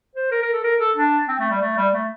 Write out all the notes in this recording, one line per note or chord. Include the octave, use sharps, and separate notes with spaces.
C5
A#4
A#4
A4
A#4
A4
D4
C4
A3
G3
A3
G3
A3